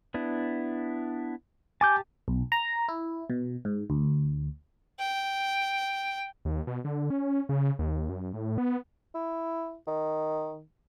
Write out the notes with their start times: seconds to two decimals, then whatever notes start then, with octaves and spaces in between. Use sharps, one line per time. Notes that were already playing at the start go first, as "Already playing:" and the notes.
0.14 B3 D4 E4
1.81 G4 G#5 A5 D6 G6
2.28 B1
2.52 A#5
2.89 E4
3.30 B2
3.65 G#2
3.90 D2
5.00 G5
6.45 D#2
6.67 B2
6.85 D3
7.10 C#4
7.49 C#3
7.79 D#2
8.09 F#2
8.34 A2
8.58 B3
9.14 E4
9.87 D#3